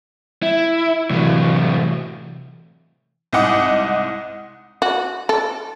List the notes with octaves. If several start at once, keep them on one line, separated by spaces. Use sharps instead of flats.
E4
A2 C3 E3 F#3
C2 G#2 D#5 F#5 D6 D#6
F#4
A4